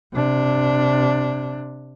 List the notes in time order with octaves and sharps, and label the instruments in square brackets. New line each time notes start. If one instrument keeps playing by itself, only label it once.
[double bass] C3 D4